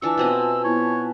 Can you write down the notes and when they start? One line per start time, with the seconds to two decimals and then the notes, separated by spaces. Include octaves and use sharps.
0.02 E3 D4 F4 G#5 A5 C#6 E6
0.18 B2 C4 D#5
0.65 B3 E4 C#5